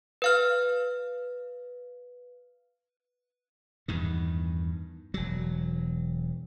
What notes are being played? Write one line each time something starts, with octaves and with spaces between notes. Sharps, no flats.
B4 F5 F6
E2 G2 D#3
E1 F#3